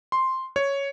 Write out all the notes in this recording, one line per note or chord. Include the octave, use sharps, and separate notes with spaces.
C6
C#5